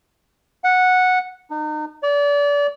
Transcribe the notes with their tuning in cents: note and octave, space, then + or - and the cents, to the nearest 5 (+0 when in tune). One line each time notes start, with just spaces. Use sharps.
F#5 -10
D#4 -35
D5 -30